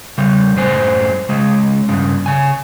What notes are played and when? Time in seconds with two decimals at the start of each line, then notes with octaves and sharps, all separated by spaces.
0.18 C#3 G3
0.56 F#2 A2 C5 G#5
1.29 C#3 G#3
1.89 G2 C#3
2.26 C#3 G#5